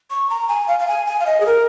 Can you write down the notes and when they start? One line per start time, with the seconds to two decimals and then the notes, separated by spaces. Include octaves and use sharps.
0.10 C#6
0.30 A#5
0.49 G#5
0.68 F5
0.79 F5
0.88 G#5
1.06 G#5
1.20 F5
1.26 D#5
1.40 G#4
1.46 A#4